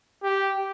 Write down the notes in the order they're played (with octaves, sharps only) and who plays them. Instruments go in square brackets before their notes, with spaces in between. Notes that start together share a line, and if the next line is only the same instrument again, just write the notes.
[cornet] G4